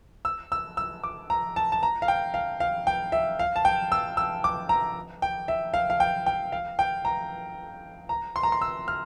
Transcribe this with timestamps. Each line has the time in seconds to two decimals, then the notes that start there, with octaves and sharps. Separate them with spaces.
0.25 E6
0.52 E6
0.77 E6
1.04 D6
1.30 A#5
1.56 A5
1.72 A5
1.83 A#5
2.02 F5
2.08 G5
2.34 F5
2.60 F5
2.87 G5
3.12 E5
3.39 F5
3.56 A5
3.65 G5
3.92 E6
4.17 E6
4.44 D6
4.69 A#5
5.22 G5
5.48 E5
5.74 F5
5.90 F5
6.00 G5
6.26 G5
6.52 F5
6.79 G5
7.05 A#5
8.09 A#5
8.36 C6
8.43 A#5
8.52 C6
8.61 E6
8.88 F6